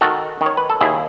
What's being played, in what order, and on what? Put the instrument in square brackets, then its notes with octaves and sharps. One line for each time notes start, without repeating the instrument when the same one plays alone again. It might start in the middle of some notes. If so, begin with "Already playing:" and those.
[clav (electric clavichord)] D#3 F#4 A4
D#3
C#5
B4
A4
D#2 E4 G#4